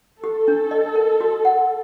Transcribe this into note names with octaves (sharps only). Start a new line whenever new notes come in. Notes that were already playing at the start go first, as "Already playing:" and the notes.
G4 A4
D4
D#5
A#4
F#4
F#5